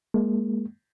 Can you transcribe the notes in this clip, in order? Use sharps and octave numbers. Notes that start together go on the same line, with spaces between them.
G#3 A#3